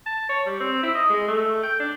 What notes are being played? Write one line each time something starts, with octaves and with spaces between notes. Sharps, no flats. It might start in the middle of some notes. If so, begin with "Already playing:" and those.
A5
C#5
G3
C4
E4
D#5
G#3
A3
G5
D4